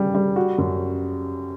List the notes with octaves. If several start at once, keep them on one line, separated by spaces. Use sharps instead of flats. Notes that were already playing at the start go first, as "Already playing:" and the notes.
Already playing: C#3 G3
G3
F#4
F#2